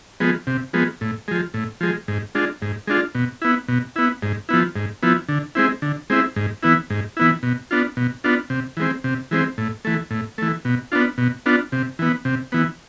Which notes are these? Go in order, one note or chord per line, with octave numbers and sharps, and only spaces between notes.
F3 G#3 B3
C3
F3 G#3 B3
A2
F3 G#3
A2
F3 G#3
G#2
G#3 D4 F4
G#2
G#3 D4 F4
B2
B3 E4
B2
B3 E4
G#2
F3 B3 E4
G#2
F3 B3 E4
D3
G#3 C4 E4
D3
G#3 C4 E4
G#2
E3 B3 E4
G#2
E3 B3 E4
B2
B3 D4 F4
B2
B3 D4 F4
C3
E3 G#3 C4
C3
E3 G#3 C4
A2
E3 A3
A2
E3 A3
B2
B3 D4 F4
B2
B3 D4 F4
C3
E3 B3
C3
E3 B3